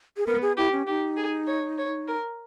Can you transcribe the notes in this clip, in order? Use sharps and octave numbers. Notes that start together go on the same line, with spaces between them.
G#4
B3 A#4
G#4
E4 G4
C#4
D#4 G4
G#4
C#5
C#5
A#4